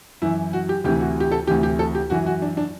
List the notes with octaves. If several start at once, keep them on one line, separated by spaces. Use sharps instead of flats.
F#2 E3 E4
F#4
G4
D2 C3 E3 G4
F#4
G4
A4
D2 C3 E3 G4
G4
A4
G4
F#2 E3 F#4
F#4
D4
D4